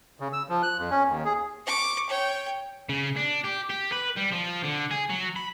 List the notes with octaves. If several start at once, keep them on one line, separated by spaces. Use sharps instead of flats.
C#3
E6
F3
F#6
F2
C#4
D#2
G#4
C#6 D6
C#5 G5
C#3
D4
G4
G4
B4
G3
F3
D3
G#4
F#3
B5